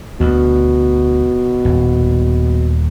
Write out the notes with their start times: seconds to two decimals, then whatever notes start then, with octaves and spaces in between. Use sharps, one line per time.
0.20 D2 B2
1.65 D#1